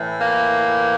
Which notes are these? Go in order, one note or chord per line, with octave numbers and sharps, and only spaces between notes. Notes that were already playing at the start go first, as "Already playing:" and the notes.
Already playing: A2 E3
A#3